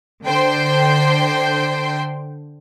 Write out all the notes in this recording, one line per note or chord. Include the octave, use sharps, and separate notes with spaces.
D3 C5 G5 C6